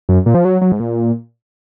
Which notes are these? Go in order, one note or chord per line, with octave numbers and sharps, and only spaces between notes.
F#2
A#2
F3
F#3
F#3
G#2
A#2